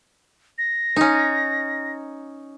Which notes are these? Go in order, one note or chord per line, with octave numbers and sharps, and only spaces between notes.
A#6
C#4 D#4